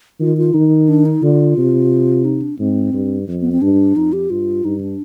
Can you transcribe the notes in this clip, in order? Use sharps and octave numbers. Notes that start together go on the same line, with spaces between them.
D#3 F4
F4
D#3 D#4
D4
D#4
D3 F4
C3
D#4
D4
G#2 C4
G2
F2
B3
C4
G2 D4
F2 D#4
G4
G2 F4
G2 D#4
D4